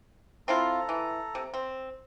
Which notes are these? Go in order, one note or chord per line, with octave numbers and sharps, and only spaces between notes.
C4 E4 F4 A4 A#5
E3
C3
C4